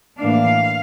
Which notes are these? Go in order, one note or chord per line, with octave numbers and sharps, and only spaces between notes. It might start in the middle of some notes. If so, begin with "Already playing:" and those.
A2 E3 A#3 D4 F5